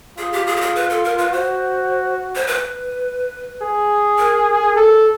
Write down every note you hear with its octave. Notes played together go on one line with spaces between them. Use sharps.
F4 G#4
G4
G#4
G4
G#4
B4
A4
A#4
B4
F#4 C5
C5
B4
G#4
A#4
A4